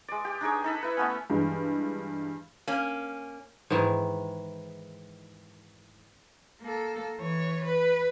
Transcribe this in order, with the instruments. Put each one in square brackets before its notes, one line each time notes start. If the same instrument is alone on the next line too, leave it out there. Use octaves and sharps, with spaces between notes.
[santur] G#3 D5
G4
D4 D#4 G#4 C#5
D#4 A4 B5
E4 B4
A3 B3 C#4
[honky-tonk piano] G2 E3 G#3
[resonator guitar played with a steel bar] A#3 C#4
[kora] G#2 D#3 E3 G#3
[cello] A#3 A4
E3 C#5
B4